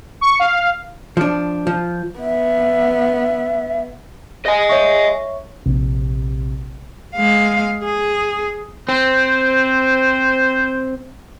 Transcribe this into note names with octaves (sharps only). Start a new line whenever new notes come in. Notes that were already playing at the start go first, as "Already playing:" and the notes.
C#6
F5
F3 D4
F3
B3 E5
D#5 G#5
C#5 E5 C#6
A#1 C3
G#3 F5
G#4
C4 C5